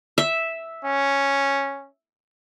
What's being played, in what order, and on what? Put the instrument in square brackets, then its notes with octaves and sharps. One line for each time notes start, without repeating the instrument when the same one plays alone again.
[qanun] E5
[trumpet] C#4